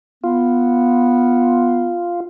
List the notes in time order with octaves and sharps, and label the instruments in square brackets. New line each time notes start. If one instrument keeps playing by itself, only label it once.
[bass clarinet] B3 [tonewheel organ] F4